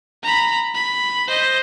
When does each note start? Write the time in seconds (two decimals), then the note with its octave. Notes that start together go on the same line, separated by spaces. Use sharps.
0.23 A#5 B5
0.74 B5
1.28 C5 D#5